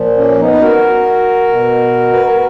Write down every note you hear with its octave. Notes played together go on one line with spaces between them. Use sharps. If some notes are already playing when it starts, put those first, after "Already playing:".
Already playing: A#2 F3
A#3 C#4
B3 D#4
B4
F#4 A#4
B2
B4
A#4